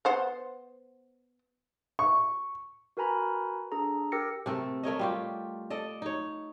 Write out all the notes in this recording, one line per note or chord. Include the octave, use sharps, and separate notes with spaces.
B3 C5 F#5
C#6
F#4 A#4 B4 G#5 A#5 B5
D4 G#4 A4 A#5
G4 A#4 G5 E6 A#6 C#7
C3 A3 A4 A#4
A3 A#4 C#5 D#5
G3 F4 G4
A4 D5 D#5
D#4 C#5